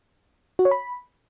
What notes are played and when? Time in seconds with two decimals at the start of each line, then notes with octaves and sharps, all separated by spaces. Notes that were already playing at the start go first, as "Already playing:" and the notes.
0.59 F#4
0.65 C#5
0.71 B5